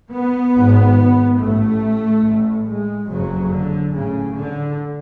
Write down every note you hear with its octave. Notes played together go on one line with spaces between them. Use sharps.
B3
G#1 G#2
A1 A2 A3
A1 A2
G#3
F#1 F2 C#3 F#3
D3
A1 A2 C#3
D3